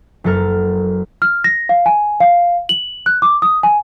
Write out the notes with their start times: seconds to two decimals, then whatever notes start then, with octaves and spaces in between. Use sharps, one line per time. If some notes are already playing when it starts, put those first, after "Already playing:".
0.24 F#1 F#3 A4 A#4 F6
1.22 F6
1.44 A#6
1.69 F5
1.86 G#5
2.20 F5
2.69 F#7
3.06 F#6
3.22 D6
3.42 D#6
3.63 G#5